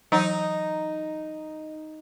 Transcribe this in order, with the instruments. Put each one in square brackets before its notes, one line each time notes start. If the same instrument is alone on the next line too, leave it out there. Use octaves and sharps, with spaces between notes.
[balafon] E3 F#3 F#5 [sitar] D#4